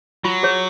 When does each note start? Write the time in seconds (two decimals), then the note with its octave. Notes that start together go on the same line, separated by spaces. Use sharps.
0.24 F#3 F4
0.43 G#4 C#5